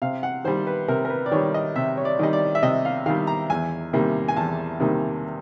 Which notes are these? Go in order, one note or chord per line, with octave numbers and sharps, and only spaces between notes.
C3 F5
F#5
D#3 G3 C5
B4
C3 A#4
A#4
B4
D5
D#3 G3 C#5
D#5
C3 E5
C#5
D5
D#3 G3 D#5
D5
E5
C3 D#5
F5
D#3 G3 F5
A#5
E2 G#5
C3 D#3 G3 A#3
G#5
E2 A5
C3 D#3 G3 A#3